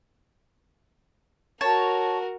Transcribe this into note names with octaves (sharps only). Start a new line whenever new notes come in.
F#4 A#4 C#5 A5